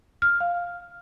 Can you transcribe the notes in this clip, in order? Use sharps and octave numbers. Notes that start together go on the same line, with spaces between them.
F6
F5